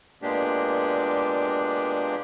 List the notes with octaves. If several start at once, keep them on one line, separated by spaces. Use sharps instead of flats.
A#2 G#3 A#3 B3 D4 G4